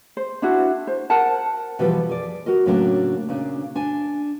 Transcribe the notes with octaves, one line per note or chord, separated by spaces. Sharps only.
C5
D4 E4 F#4
C5
A#4 F#5 A5
B2 E3 F3 G3 A4 B4
G#4 D5
F#4 A#4 D#5
A2 C#3 F#3 A#3 D4
A#2 C#3 D4
D4 G#5